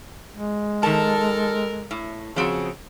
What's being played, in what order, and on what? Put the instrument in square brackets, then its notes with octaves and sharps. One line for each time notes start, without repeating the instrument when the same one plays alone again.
[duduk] G#3
[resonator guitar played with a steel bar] D#3 A5 [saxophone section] A4 A#4
[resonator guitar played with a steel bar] A2
[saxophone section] C#3 [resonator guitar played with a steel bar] F3 C4 F#4